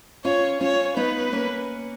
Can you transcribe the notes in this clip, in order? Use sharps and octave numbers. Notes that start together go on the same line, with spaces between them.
C#4 F4 C#5
C#4 F4 C#5
B3 D#4 B4
A#3 C#4